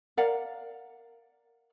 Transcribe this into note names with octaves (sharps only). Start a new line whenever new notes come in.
A#4 D5 F5 F#5